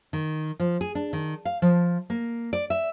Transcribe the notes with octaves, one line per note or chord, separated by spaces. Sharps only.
D#3
F3
G#4
D4
D#3
F5
F3
A#3
D5
E5